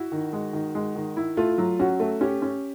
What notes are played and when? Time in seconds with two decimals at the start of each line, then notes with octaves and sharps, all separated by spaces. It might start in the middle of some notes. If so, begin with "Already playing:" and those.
Already playing: E4 F#4
0.12 D#3
0.33 G#3
0.53 D#3
0.75 G#3
0.96 D#3
1.17 E4
1.37 A3 F4
1.58 F#3
1.79 C#4 F#4
2.00 A3
2.21 C#4 G4
2.42 C#4